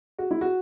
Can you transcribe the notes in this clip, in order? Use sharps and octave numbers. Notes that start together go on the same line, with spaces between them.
F#4
E4
F#4